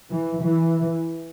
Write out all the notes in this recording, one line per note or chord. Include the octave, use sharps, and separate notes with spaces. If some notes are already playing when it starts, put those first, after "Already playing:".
E3
E3